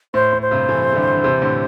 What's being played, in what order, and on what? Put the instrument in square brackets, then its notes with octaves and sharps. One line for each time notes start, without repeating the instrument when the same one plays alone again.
[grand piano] A2 [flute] C5
[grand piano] A2
[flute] C5
[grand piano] G2 C3
E3 A3
A3
D3 G3
D3
C3 E3
A2 D3